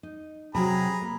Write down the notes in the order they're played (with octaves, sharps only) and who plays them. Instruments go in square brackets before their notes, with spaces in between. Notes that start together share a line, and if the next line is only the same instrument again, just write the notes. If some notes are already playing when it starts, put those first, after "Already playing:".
[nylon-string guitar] D#4
[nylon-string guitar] C3 F#3 C4 [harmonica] G#4 A#5 B5
[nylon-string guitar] A#3